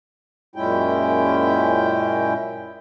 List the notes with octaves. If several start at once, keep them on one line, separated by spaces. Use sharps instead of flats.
F#2 A#2 G#3 C#4 E4 G5